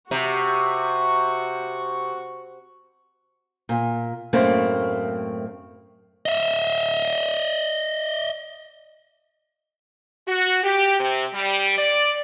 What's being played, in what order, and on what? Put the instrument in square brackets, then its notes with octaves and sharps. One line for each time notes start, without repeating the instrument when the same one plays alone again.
[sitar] C3 [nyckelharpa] F#4 C#6
[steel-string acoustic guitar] A#2
F#2 A2 A3 A#3 C4
[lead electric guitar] D#5 E5
[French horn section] F#4
G4
C3
G3
D5